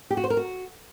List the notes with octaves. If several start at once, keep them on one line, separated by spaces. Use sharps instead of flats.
G4
F#4
C5
A#4
F#4